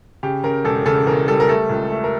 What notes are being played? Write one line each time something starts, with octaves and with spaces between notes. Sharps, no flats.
C#3 G4
C#3 A#4
E1 A4
C#3 A4
E2 A#4
G3 A4
A#4
A3 A4
C#2
A3
A#4